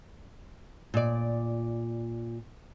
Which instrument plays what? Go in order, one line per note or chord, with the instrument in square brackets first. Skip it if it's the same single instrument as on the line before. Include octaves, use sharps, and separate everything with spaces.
[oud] A#2 D5